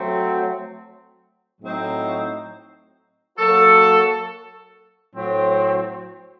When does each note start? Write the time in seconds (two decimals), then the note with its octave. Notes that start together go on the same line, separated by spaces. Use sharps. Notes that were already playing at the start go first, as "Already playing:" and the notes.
Already playing: F#3 A3 C4
1.60 A2 F#3 C4 D#4
3.38 F#3 A#3 F#4 A4
5.13 A2 F#3 C4